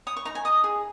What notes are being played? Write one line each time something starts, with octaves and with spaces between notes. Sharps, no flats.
C#5 D#6
C#6
D#4 A#5
G#5
D#5 D#6
G#4